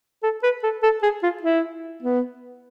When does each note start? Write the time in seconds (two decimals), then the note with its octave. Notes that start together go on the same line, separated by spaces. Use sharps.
0.23 A4
0.43 B4
0.63 A4
0.83 A4
1.03 G#4
1.23 F4
1.43 E4
2.02 B3